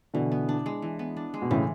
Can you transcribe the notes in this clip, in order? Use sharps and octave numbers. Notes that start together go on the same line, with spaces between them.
B2 D3 E3
B3
D4
G#3
E3
B3
D4
G#3
B2
A2 C#3 E3